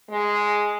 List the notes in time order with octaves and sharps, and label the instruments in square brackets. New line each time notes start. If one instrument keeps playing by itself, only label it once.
[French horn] G#3